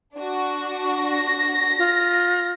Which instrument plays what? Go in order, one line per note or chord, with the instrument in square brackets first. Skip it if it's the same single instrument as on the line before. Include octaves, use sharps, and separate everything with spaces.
[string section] D4 F#4
[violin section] A#6
[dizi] F4